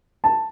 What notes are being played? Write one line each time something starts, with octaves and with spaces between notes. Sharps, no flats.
A5